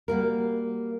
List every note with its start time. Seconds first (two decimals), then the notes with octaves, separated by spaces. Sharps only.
0.08 G3 A#3 F#4 A#4